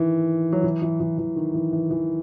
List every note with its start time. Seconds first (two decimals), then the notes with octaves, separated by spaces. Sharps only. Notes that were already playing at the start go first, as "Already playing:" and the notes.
Already playing: D#3 E3
0.52 F#3
0.64 E3
0.82 E3
1.00 E3
1.18 E3
1.36 D#3
1.54 E3
1.72 E3
1.90 E3